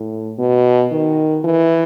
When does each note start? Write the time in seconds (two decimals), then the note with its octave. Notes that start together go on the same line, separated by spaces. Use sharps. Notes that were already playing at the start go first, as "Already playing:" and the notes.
Already playing: A2
0.39 B2
0.92 D#3
1.44 E3